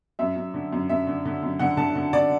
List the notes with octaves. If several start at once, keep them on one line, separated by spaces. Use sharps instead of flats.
F#2 E5
F#2
D3
F#2
F#2 E5
D3
D3
F#2
D3 F#5
D3 A5
D3
D3 D5